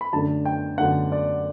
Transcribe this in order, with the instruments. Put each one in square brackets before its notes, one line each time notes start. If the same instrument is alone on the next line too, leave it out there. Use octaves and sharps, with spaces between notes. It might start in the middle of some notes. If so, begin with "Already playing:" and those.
[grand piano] B5
F#2 D3 A3 D4 A5
G5
F#2 D3 A3 D4 F#5
D5